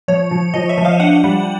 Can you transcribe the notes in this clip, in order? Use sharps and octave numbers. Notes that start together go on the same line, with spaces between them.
F3 C#5
F3
F3 D#5
E5
F3
F5
D4 F#5
G3